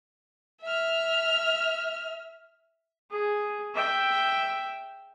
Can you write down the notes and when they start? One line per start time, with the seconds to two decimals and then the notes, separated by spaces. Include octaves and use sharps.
0.62 E5 F6
3.11 G#4
3.75 E5 G5